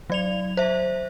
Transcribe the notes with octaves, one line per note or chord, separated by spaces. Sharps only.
F#3 D5 F7
C5 E5